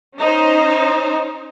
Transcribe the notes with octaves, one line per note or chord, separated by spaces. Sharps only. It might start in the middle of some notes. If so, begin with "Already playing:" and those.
C#4 D#4 C5